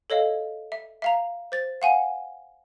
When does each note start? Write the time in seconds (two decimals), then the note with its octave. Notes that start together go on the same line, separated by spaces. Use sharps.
0.10 A4 C#5 D#5 F5
0.72 E5
1.02 E5 F5 A#5
1.52 C5 A6
1.82 F5 F#5 G#5